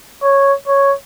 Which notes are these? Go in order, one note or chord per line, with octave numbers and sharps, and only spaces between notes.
C#5
C#5